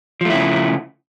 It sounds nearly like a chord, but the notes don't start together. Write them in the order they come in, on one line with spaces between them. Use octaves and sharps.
F3 A3 E4 C#3